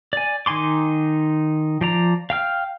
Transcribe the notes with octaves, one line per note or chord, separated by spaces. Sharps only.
D5 G#5
D#3 D#4 G#5 C6 D6
F3 D5 A#5
F5 G5 F6